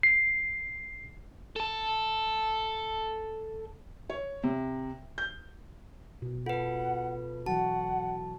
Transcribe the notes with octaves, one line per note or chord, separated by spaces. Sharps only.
C7
A4 A5
C#5
C3
G6
B2
F4 A4 B4 F#5
E3 F#3 F#4 F#5 A5